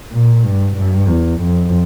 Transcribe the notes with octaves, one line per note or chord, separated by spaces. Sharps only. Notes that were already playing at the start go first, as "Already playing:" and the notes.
A#2
G2
G2
E2
F2